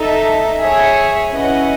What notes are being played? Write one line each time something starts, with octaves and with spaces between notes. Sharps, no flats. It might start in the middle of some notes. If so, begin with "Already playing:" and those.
Already playing: D#4 A4 E5
G#4 C#5 E5
C#4 E4 B4 D#5 F#5